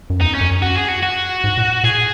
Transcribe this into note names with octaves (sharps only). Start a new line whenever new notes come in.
F#2
E2 D#4
C#4
F#2
F#4
G#4
F#4
F#4
G#2
A#2
A#2 G#4